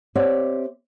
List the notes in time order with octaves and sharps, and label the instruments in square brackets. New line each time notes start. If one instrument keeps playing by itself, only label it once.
[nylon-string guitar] C4 G4 C#5 D5 E5 F#5